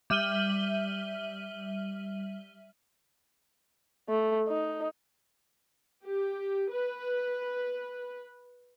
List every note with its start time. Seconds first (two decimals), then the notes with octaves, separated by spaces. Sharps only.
0.10 G3 E5 F6 D#7 F#7 G7
4.09 A3
4.48 D#4
6.04 G4
6.70 B4